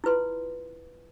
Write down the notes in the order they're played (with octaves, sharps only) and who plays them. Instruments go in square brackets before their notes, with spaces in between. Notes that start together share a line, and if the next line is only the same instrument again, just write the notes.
[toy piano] E4 F4 B4 C6